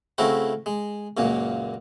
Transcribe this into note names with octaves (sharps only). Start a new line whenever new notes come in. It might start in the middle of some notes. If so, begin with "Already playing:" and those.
C#3 A3 C4 E4 F#4 A#4
G#3
C#2 F#2 A#2 A#3